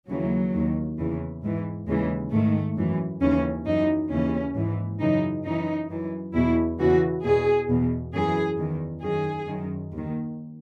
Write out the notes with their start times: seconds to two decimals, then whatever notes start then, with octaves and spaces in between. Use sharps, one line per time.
0.08 D#2 C#3 E3 F#3
0.53 D#2 D#3
0.98 E2 C#3 E3
1.42 G#2 E3
1.87 D#2 C#3 E3 G#3
2.32 G#2 D#3 A3
2.77 F#2 E3
3.21 D#2 C#3 E3 C#4
3.66 F#2 E3 D#4
4.11 D#2 C#3 E3 C#4
4.55 G#2 E3
5.00 F#2 C#3 E3 D#4
5.45 F#2 E3 D#4
5.89 F#2 E3
6.34 E2 B2 E4
6.79 E2 C#3 E3 F#4
7.24 E2 B2 G#4
7.69 E2 B2
8.13 F#2 E3 G#4
8.57 E2 D#3
9.02 F#2 D#3 G#4
9.47 F#2 D#3
9.92 D#2 D#3